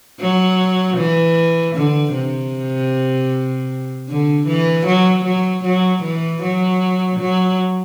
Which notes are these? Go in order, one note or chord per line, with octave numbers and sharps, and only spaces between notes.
F#3
E3
D3
C3
D3
E3
F#3
F#3
F#3
E3
F#3
F#3